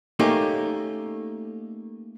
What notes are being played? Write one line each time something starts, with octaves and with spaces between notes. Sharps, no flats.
A3 A#3 C#4 D#4 G4